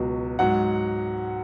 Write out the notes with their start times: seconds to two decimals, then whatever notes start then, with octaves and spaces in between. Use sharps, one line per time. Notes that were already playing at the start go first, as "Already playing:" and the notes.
Already playing: C#2 B2 F#3
0.39 G#2 F#3 F#5